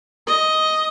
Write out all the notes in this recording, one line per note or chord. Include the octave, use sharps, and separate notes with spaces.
D#5